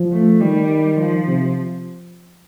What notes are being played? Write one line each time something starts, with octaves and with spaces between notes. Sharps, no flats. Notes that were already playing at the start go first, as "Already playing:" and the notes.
Already playing: F3
A3
D#3 G3
F3
C3